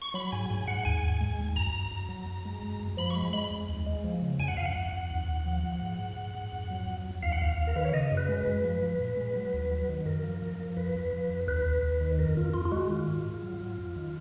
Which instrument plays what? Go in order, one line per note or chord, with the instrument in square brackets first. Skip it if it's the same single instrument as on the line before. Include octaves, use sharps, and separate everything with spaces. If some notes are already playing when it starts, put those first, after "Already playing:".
[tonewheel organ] C#6
F#3 B5
G#2 G#5
G#2 G#5
G#2 F#5
D#2 G#5
D#2
G#3
D#2
F#2 A#5
F#2
F#2
F#3
F#2
G#3
F#2
F#2
F3 B5
C#6
G#3 B5
G#3 B5
F2
D#2
G#3
F3
C#3
F2 G#5
F#5
F2 F5
F#5
F2
F2
D#2
D#2
F3
F3
G#2
G#2
G#2
G#2
F2
F#3
F2
F2
D#2 F5
F#5
D#2 F5
D#2
A#4
D#3 B4
C#5
C#3 D#5
F#2
B4
G#3
B4
F#2
F3
F3
A#2
G#3
F#3
D#2
F#3
D#3
F#2 A#4
F3
F3
F3
F2 B4
F2
F3
F2
D#2 B4
D#2
D#2
D#3
F2 A#4
F2 F4
F2 F4
F4
G#3 F#4
D#3 F4
G#2
G#2
F#3
F#3
F2
D#3